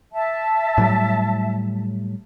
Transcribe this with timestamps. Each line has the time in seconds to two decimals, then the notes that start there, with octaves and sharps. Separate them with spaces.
0.13 E5 A5
0.78 A2 F#3 G3